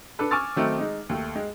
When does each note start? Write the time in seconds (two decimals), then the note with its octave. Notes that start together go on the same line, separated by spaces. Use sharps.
0.19 D4 A4 B4
0.31 G#5 C#6 D6 E6 F6 A6
0.56 D#3 F#3 A3 C4 D#4
0.78 G#3 D#4
1.09 D#2 A3
1.36 G#3